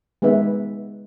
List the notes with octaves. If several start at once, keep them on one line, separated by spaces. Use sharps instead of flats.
G#3 B3 D#4 B4 E5